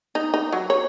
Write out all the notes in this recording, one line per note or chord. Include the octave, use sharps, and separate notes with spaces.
D#4
D#4
F#3
C#5